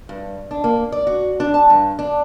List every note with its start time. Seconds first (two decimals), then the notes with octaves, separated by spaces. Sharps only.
0.09 G2
0.51 D4
0.64 A#3
0.92 D5
1.07 F#4
1.40 D4
1.54 A5
1.70 G2
1.99 D4